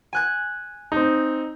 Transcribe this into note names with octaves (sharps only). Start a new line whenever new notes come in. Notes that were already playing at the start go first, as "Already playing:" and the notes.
G#5 F#6 G#6
C4 D#4